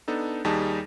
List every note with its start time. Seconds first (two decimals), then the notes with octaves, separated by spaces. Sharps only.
0.08 B3 D4 D#4 A4
0.45 D#2 G3 D#4 G#4 A5